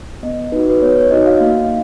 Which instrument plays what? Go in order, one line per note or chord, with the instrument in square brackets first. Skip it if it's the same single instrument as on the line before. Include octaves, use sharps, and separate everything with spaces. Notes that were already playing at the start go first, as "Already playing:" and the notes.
[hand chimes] B3 D#5
D#4 F#4 B4
B4
B3 C#5
C#5
D#4 F#4 D#5
F5
A#3